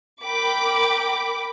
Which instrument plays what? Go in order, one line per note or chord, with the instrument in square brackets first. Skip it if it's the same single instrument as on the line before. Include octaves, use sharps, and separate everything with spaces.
[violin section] A#4 G5 B5 D6